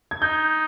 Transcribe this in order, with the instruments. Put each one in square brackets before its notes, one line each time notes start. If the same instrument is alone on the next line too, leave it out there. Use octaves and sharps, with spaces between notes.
[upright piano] G#6
[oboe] D#4 [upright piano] G6